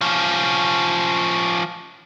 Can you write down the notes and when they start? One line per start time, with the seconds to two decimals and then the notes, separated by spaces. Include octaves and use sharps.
0.01 F3 C#4